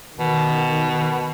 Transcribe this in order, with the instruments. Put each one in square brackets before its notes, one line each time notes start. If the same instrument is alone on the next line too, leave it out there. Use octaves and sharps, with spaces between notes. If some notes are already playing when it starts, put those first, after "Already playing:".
[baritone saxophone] B2 [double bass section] D#3